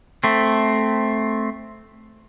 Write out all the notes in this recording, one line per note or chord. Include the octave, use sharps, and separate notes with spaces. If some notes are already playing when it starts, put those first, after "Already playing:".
A3 C4